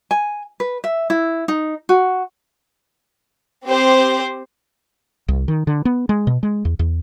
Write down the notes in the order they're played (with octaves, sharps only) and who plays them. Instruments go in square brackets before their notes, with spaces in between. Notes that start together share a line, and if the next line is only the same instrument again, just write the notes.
[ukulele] G#5
B4
E5
E4
D#4
F#4
[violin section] C4 G4 C5
[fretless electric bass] C2
D#3
D3
B3
G#3
B2
G#3
E2
E2